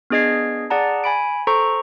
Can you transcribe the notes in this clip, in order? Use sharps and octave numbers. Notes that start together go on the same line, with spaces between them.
B3 D4 G#4 D#5 G#6 C7
G#4 D5 F#5 A5 A#5
G#5 B5 D7
A4 C5 A#5 C#6